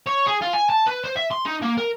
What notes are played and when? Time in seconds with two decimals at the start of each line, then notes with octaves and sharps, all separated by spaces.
0.07 C#5
0.27 G#4
0.42 F4
0.53 G#5
0.70 A5
0.88 B4
1.05 C5
1.17 E5
1.32 C6
1.46 D#4
1.62 A#3
1.78 A#4